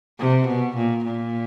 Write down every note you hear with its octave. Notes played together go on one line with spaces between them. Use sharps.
C3
B2
A#2
A#2